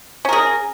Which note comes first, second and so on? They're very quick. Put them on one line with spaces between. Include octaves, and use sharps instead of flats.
C#4 A#4 G#4